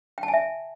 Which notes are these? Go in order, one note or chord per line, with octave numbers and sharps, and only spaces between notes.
G5
A5
G#5
E5